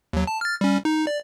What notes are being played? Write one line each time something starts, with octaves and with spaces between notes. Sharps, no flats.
D#2 F#3
A5
F6 A6
G3 C#4
D#4
D5